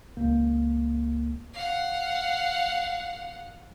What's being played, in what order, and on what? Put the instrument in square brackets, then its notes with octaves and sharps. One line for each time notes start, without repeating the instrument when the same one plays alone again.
[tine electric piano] C#2 A#3
[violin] F5 F#5